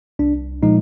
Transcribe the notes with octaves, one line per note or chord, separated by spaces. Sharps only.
C2 D4
A#2 F3 G#3 D#4